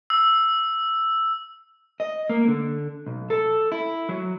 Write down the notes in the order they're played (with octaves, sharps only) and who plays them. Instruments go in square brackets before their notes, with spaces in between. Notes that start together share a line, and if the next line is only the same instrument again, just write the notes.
[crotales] E6
[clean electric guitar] D#5
A#3
D3
B1
A4
E4
F#3